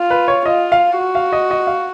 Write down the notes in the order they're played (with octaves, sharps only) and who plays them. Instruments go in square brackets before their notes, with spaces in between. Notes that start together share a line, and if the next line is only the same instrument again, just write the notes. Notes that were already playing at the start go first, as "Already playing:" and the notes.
Already playing: [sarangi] F4
[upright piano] B4
C#5
[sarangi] F4 [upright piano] D#5
[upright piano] F5
[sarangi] F#4
[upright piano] F5
D#5
D#5
F5